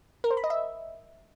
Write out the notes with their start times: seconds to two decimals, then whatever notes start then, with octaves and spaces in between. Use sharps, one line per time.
0.24 A#4
0.31 C5
0.37 B5
0.44 D#5
0.50 E5